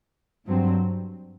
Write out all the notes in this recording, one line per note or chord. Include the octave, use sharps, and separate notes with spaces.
G2 F#3 C4